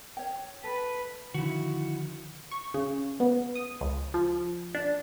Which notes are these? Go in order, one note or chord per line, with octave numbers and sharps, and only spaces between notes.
C#5 G5
A4 B4
D3 D#3 F3 E4 F#4
C#6
C#3
B3
D#6
C#2
F3
D4